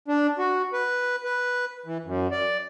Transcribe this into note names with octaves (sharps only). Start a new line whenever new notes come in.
D4
F#4
B4
B4
E3
F#2
D5